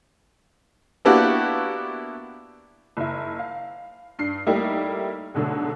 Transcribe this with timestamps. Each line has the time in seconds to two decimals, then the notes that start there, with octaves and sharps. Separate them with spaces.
1.05 A#3 B3 D4 E4 F#4 G4
2.97 F#1 E4
3.39 F5
4.19 G2 C7
4.46 G3 A3 A#3 D#4 E4 G4
5.35 G#2 B2 D3 F#3 A3